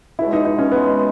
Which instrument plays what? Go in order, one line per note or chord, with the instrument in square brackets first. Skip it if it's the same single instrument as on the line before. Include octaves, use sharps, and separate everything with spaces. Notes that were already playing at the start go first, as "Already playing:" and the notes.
[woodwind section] C#2 B2 G#3 [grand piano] E4
[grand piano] D#4
D#4
C#4
[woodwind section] C#2 B2 G#3 [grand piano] B3